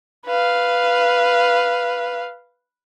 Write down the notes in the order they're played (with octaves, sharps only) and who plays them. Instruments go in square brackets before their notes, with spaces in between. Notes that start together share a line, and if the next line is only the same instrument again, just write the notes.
[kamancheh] B4 F5